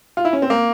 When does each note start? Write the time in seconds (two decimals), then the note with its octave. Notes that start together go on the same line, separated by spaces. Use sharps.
0.17 F4
0.25 E4
0.33 C#4
0.42 C4
0.50 A#3